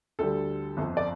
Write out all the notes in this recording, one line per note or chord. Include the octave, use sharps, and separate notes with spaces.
D2 D3 G3 A4
G1 F2 F3
D5